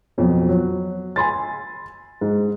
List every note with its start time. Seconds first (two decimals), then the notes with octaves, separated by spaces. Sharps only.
0.18 F2 B2 F#3
0.49 F#3
1.16 G#5 B5 C6 A6
2.21 G#2